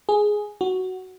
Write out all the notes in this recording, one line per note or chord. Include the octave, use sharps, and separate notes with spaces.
G#4
F#4